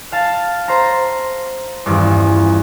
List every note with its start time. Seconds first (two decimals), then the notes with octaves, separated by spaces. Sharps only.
0.12 F5 A5
0.68 C5 A#5
1.86 D#1 E2 G2